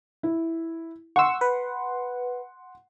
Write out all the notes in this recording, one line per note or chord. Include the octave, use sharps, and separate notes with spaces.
E4
F#5 C6 C#6 E6 C#7
B4